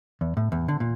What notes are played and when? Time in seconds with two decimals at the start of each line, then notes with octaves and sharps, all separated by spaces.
0.21 E2
0.37 A2
0.52 E2
0.68 D3
0.80 A#2